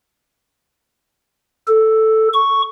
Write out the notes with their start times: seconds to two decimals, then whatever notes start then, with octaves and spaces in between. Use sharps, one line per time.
1.67 A4
2.33 C#6